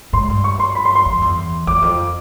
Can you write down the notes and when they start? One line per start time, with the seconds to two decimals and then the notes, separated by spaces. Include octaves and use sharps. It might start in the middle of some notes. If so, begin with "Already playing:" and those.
0.13 G#2 C6
0.29 G2
0.44 C#6
0.60 C6
0.75 B5
0.85 C6
0.95 C6
1.06 F2
1.21 E2
1.67 E2 D6
1.82 F2